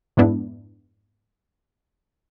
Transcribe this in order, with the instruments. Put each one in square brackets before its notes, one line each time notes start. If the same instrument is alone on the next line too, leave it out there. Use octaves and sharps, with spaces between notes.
[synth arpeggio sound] F2 G#2 G#3 B3 D4 E4